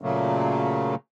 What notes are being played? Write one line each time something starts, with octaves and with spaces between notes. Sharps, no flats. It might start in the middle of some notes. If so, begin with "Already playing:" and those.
A#2 C#3 F#3 A3 A#3